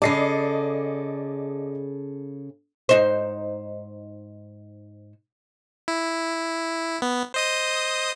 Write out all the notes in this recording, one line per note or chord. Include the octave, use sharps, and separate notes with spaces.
C#3 G#4 A4 D5 D#5 C7
G#2 D#4 C5
E4
B3
C5 D#5 D#6